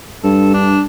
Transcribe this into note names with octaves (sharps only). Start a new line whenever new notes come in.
G2 A4
D4